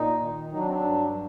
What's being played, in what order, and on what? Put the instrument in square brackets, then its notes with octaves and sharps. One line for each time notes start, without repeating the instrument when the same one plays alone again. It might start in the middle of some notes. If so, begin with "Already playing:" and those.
Already playing: [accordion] A#2 D#4
D#3
F#3 D#4
D4
C4
D4
G2